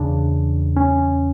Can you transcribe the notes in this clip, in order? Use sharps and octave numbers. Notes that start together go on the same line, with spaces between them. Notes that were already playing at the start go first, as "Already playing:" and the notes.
Already playing: E2 C#3 D4
C#4